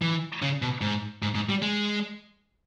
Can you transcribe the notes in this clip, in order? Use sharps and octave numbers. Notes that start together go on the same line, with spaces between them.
E3
C#3
B2
G#2
G#2
G#2
G3
G#3